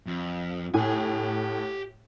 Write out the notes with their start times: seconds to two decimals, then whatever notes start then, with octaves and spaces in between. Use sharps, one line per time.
0.06 F2
0.74 A2 G4 G#5